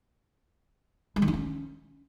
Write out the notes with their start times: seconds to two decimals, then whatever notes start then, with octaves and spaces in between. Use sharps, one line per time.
1.16 G#3
1.22 D#3
1.28 D#4
1.34 C#4